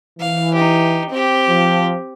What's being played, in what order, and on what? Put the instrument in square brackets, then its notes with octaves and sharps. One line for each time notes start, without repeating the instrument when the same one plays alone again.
[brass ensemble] E3 [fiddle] F5
[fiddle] D#4 G4
C4 G4
[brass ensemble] F3